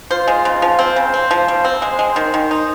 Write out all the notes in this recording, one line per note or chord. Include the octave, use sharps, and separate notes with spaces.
F4 C5
G#3
C#3
F3
C4 C5
C#3
C4
F3
G3
C4
G#3
G#3
D#3 C5
D#3
D#4